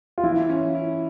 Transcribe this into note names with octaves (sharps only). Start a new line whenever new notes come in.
F4
E3 E4
C#4
E4